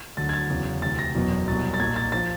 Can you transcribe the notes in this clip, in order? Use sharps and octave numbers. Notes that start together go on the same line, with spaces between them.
D2 D3 F#3 A6
G#6
A6
E2 C#3 F#3
D2 C3 E3 A6
A#6
F#1 E2 B2 F#3
C2 B2 F#3 A6
A6
B1 A#2 F#3 G#6
A6
F3 A6